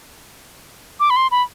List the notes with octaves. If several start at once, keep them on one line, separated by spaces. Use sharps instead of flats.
D6
B5
C6
B5